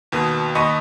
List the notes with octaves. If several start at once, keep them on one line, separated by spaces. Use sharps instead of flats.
D#2 B2 D#6
D#2 D#5 B5 C#6 D#6